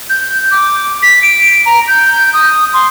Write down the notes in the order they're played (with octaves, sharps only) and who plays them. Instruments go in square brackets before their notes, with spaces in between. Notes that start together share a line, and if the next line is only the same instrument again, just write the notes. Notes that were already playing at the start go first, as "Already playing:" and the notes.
[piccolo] G6
D6
B6
D7
A#5
G6
D#6
C6